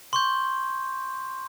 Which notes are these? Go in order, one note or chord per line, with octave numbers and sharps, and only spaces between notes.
C6 C#6 G6